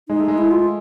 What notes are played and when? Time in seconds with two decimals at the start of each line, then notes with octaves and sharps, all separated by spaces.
0.09 G#3 D#4
0.19 A3
0.28 G#3
0.38 E4
0.51 F4